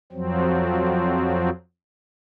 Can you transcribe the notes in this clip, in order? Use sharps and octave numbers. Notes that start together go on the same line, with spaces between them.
F2 F3 F#3 C4